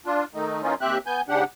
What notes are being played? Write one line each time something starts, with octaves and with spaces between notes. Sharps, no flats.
D4 F4
D#3 A3 D#4
E3 A#3 C#4 D#4 F4
D#2 C4 G4 E5 F#6
B3 G#5 G6
G#2 C#3 D4 G4 F#5